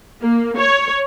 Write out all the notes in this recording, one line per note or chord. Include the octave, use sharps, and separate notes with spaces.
A#3
C#5